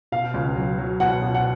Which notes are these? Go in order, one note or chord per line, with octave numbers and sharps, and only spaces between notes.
B2 F5
C#2
F#3
F#3
B2 F#5
B2
F#5